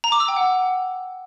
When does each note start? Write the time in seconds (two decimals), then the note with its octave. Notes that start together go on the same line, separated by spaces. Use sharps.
0.04 A#5
0.12 D6
0.20 E6
0.28 G5
0.36 F#5